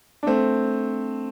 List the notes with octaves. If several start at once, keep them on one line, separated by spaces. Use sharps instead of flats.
D4
A3 C4